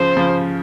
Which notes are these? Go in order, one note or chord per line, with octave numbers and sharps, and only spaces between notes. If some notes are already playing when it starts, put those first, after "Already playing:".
Already playing: C#3 F3 C5
C#3 F3